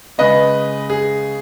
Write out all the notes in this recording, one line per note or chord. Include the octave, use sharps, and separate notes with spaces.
C#3 G#3 B3 B4 D#5
G#4